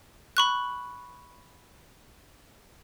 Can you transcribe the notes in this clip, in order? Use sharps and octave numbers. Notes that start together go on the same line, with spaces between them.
B5 C#6 F#6